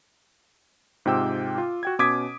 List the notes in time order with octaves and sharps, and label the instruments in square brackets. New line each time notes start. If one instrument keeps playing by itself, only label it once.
[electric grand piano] G#2 C3 F4 G5 D6 E6
F4
F#4 G5 G#6
B2 C#4 D6 D#6 G#6 B6